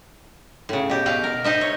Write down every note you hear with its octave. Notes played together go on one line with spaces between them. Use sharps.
A2 C#3
B2 G4
B2 F5 G5
A#4
C4 D#4 D#5 E5
C#5